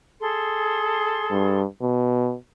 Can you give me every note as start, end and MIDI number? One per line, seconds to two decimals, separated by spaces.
0.20 1.60 68
0.20 1.60 69
0.20 1.60 84
1.31 1.65 43
1.82 2.35 47